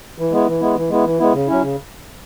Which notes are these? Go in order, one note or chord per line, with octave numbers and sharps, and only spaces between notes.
E3
G#3 B3 E4
E3
G#3 B3 E4
E3
G#3 B3 E4
E3
G#3 B3 E4
C#3
F#3 C#4 E4
C#3